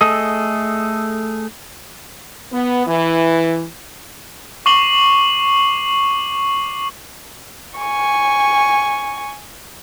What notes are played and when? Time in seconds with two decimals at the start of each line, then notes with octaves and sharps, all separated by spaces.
0.01 A3 G#4 A4 D#5
2.53 B3
2.87 E3
4.66 C#6 D6 C7 F#7 G7
7.79 G#5 C#6